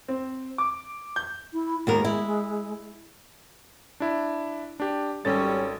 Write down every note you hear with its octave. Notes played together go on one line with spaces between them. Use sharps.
C4
D6
G6
E4
D#2 G#3 B3 A#4
E4
D4 E4
D4 G4
G#1 G3 C#4 A4 A6